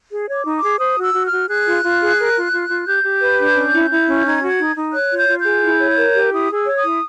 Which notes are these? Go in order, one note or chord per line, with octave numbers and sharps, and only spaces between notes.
G#4
C#5
D6
D#4
D6
G#4
C5 D#6
F#4 E6
F#4
F6
F#4
G#4 F#6
F4
F4
G#4
A#4
F4
F4
F4
G4 G6
G4
B4
D4
C#4
E4
E4
C#4
D#4 G#6
F#4 G#6
D#4
D#4
C#5 F#6
F4
G6
F4
G6
G#4
E4
C#5
A#4
G4
E4 D#6
G#4
E6
C#5
D#6
E4